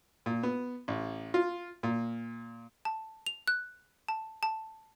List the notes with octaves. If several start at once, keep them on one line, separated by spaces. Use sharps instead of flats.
A#2
B3
A1
F4
A#2
A5
F7
F#6
A5
A5